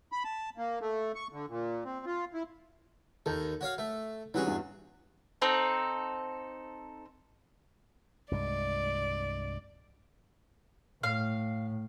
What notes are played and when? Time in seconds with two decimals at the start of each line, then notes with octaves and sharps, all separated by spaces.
0.12 B5
0.24 A5
0.57 A#3
0.81 A3
1.15 C#6
1.32 D3
1.48 A#2
1.85 C4
2.06 F4
2.34 E4
3.26 D#2 D#3 A4
3.61 F#4 C#5 F5
3.78 A3
4.34 E3 F#3 G3 C#4 F#4 G#4
4.46 E2 G2
5.42 C4 D#4 A4
8.31 C2 G2 G#3 D5
11.03 A2 F5